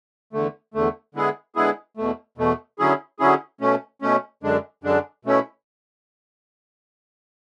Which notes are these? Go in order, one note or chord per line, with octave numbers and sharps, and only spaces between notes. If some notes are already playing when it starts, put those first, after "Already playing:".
E2 D3 A3
E2 D3 A3
D3 G#3 B3 E4 G#4
D3 G#3 B3 E4 G#4
E2 B2 A3
E2 B2 A3
D3 F#3 C#4 E4 G#4
D3 F#3 C#4 E4 G#4
B2 A3 C#4
B2 A3 C#4
F#2 D3 G#3 D4
F#2 D3 G#3 D4
B2 A3 C#4 E4